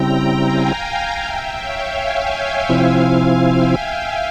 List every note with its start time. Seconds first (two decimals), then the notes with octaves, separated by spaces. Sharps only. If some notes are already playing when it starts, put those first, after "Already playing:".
Already playing: C#3 G3 C4 E4 G5 A#5
0.41 F5 G#5
1.17 E5 G5
1.56 C#5 F5
1.93 F5 G#5
2.69 C3 F3 C4 E4 F5 G#5
3.07 F5 G#5
3.45 E5 G5